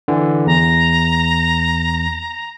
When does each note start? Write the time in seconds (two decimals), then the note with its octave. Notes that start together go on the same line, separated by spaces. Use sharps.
0.08 D3 E3
0.47 E2 A#5